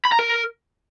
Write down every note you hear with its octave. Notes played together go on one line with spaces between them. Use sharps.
B5
A#5
A#4